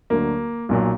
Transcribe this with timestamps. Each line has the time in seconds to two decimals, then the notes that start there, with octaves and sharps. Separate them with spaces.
0.10 D2 D3 F#3 A#3
0.69 B1 A#2 F#3